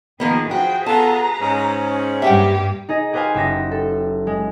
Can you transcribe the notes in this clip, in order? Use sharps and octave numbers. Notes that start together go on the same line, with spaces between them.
D#3 F3 A#3 B3 G#4
F3 F#4 G#4 B4 G5
B3 F4 A4 A5 A#5
G#2 C#4
G2 A#3 G4 E5 F#5 G5
D#4 G#4 D#5
G4 G#4 B4 C5 F5 G#5
F#1 G4 E5 A#6
A4
G#3